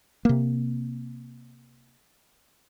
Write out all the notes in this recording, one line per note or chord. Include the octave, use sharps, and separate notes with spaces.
C3 A#3